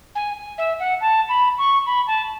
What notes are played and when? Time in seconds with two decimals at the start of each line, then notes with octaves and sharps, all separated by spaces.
0.15 G#5
0.58 E5
0.80 F#5
1.01 A5
1.29 B5
1.58 C#6
1.86 B5
2.07 A5